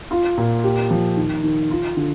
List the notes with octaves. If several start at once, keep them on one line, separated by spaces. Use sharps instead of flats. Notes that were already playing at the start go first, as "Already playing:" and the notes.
F4
A#2
G4
F3
D#3
D#3
F4
D3